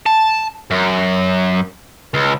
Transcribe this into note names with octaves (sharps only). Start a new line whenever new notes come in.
A5
F#2
C#2